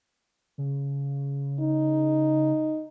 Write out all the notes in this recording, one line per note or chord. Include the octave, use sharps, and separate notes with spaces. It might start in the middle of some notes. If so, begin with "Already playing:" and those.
C#3
D#4